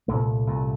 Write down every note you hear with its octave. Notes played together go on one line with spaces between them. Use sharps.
C2 A#2 A3
C2 A#2